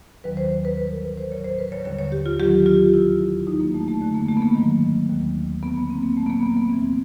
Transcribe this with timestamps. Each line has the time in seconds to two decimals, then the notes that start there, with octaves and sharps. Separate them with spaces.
0.24 D#2 D#3 F#3 B4
0.37 C5
0.51 C5
0.65 B4
0.77 G#2 E3 G3 B4
0.91 A#4
1.05 B4
1.17 C5
1.31 F#3 C#5
1.35 A2
1.44 C5
1.59 B4
1.72 C#5
1.85 D#2 D3 G3 C#5
1.99 C#5
2.12 G4
2.26 F4
2.40 D#2 D#3 F#3 G4
2.66 F4
2.94 E2 C3 F3 E4
3.47 G#2 D#3 F#3 D#4
3.60 A#3
3.74 A3
3.88 A3
4.01 F#2 D3 F3 A3
4.15 A#3
4.28 A3
4.37 B3
4.42 A#3
4.55 G#2 D#3 F#3
5.09 D#2 D#3 F#3
5.63 D2 D3 F#3 B3
5.76 A#3
5.90 C4
6.03 A#3
6.17 A#2 F#3 A3
6.26 B3
6.30 A#3
6.43 B3
6.57 B3
6.70 E2 C3 E3 G3 C4